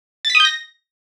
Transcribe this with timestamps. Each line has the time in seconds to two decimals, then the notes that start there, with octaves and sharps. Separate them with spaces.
0.25 A6
0.30 B6
0.35 D#6
0.40 G6
0.45 A#6